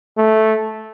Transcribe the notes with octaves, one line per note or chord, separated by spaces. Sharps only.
A3